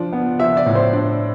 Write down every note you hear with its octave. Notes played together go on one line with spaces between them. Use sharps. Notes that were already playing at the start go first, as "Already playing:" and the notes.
Already playing: F3 D4
B3
F3 E5
D5
A2
C5
D4